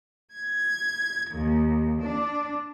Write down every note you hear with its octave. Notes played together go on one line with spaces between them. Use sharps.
G#6
D#2
D4